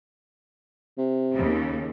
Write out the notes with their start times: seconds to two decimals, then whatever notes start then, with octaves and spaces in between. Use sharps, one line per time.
0.98 C3
1.34 D#2 C#3